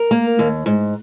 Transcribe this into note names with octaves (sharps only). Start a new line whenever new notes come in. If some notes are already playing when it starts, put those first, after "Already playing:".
Already playing: A#4
A#3
D#2
G#2